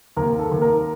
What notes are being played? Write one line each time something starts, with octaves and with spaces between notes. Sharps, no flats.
D#2 A#4
A4
D#2
A#4